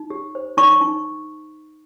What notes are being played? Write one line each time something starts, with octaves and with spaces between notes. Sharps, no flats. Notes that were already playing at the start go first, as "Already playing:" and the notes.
Already playing: D#4
G4
C5
D#4 C#6
D#4